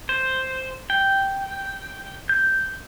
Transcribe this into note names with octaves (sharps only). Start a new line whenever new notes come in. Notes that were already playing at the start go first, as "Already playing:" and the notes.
C5
G5
G6